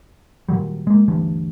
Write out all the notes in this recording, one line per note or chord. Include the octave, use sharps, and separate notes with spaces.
A#2 D#3 F#3 G3
G#3 A#3
D2 G2 E3